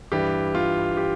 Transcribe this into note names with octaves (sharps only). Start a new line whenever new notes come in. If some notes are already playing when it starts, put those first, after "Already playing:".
G2 E3 G3 G4
F4
G4